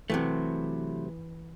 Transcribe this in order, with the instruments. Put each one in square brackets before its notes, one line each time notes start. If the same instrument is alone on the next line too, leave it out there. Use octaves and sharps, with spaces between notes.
[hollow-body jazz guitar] C3 F#3 A3 [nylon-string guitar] E3